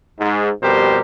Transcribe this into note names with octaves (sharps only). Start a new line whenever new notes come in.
G#2
F2 B2 G3 G4 A#4 C5